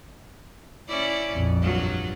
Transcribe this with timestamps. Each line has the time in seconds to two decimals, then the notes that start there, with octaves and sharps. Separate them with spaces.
0.88 C#4 E4 D5
1.31 A#1 F2
1.62 G2 F#3 F4